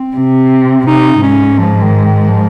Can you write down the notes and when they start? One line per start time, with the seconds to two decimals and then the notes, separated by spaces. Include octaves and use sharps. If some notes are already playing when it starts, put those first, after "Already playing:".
Already playing: C4
0.16 C3
0.87 C3 D#4
1.23 G#2 C#4
1.58 F3
1.82 D#3
2.05 D#3
2.29 F3